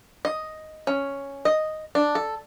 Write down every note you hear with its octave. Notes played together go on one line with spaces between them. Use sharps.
D#5
C#4
D#5
D4
A4